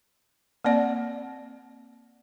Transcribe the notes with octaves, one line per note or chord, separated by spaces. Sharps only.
A#3 C4 D5 F#5